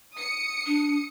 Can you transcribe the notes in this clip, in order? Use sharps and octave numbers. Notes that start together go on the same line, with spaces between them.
D#6 C#7
D4